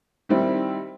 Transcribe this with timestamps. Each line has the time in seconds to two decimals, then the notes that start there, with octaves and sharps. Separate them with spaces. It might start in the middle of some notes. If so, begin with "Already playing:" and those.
0.29 D#3 G3 C4 E4